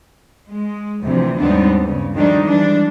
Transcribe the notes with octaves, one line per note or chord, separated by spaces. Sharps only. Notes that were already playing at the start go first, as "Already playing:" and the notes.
G#3
D2 C3 E3 F3
D#2 G#2 G3 B3 C4 D4
G2 C#3
D#3 F3 G3 A3 D4 D#4
E3 G3 G#3 D4